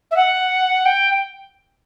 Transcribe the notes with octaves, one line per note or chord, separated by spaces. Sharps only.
E5
F#5
G5